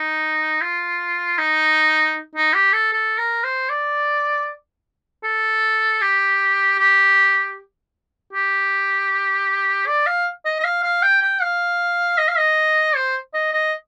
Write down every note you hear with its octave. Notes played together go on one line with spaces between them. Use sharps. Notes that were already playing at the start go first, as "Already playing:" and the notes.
Already playing: D#4
F4
D#4
D#4
G4
A4
A4
A#4
C5
D5
A4
G4
G4
G4
D5
F5
D#5
D#5
F5
F5
G5
G5
F5
D#5
F5
D#5
C5
D#5
D#5